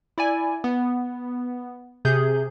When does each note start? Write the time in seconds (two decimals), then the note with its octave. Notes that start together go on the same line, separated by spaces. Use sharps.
0.18 E4 D5 G#5
0.64 B3
2.05 C3 G#4 G6